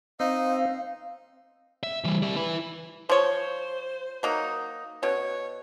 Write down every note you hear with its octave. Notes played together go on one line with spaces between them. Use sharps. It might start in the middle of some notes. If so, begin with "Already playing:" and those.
C4 D#4 F5
E5
E3 G3
G3 E5
E4 B4
F3 C5 C#5
F#3 A#3 D#4
B2 C#5